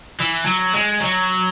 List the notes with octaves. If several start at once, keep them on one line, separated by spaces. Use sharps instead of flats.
E3
F#3
G#3
F#3